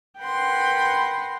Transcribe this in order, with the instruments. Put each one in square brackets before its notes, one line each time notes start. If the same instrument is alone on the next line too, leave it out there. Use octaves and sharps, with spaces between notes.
[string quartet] A#4 B4 F#5 G5 B5 C6